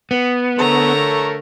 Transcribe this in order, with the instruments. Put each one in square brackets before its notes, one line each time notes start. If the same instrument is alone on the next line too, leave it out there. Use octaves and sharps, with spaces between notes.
[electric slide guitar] B3
[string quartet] D3 A#5 E6 [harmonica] A3 A#4 C#5